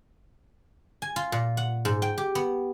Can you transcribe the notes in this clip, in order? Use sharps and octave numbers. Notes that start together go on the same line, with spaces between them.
G#5
F4
A#2
F#5
G#2
G5
G4
B3